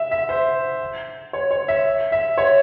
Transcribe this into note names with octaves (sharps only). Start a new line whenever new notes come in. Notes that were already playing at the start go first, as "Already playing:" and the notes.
Already playing: E5
E5
C5
C#5
C#5
E5
E5
C#5